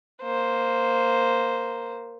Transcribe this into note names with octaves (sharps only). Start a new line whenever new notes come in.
A#3 C5